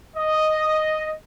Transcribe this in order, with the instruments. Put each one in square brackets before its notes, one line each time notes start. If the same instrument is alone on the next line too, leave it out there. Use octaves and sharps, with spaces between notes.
[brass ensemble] D#5